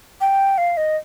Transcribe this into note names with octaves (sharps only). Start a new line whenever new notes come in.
G5
F5
D#5